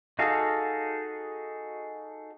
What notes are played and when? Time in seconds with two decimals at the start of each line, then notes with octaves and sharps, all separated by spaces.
0.19 D#4 F#4 G#4 A4 F5